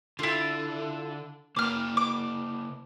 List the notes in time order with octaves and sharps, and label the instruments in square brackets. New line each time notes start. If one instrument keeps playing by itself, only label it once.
[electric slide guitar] D3 A4 [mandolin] E4 F4
[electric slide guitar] C#3 A#3 A#4 [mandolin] D6 F6
[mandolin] D6